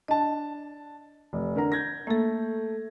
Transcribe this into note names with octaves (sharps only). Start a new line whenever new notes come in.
D4 D#5 A5
F1
D3 A#4 A#5
G6 G#6 A#6
A3 A#3 A4